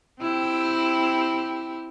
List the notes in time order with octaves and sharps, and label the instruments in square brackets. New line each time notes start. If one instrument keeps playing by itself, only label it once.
[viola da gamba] C4 E4 G4